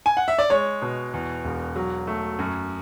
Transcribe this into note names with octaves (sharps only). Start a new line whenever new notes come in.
G#5
F#5
E5
D5
G#3 C#5
B2
E2
E1
F#3
A3
F#2